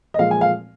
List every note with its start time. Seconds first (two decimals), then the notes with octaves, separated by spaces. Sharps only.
0.14 D#5
0.19 A#2 F3 G#3 F5
0.31 G#5
0.41 F5